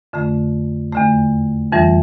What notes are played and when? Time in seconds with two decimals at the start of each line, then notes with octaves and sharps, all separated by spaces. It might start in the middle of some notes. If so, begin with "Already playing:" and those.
0.13 F2 D3 A3
0.93 E2 D3 A3
1.72 F2 E3 G3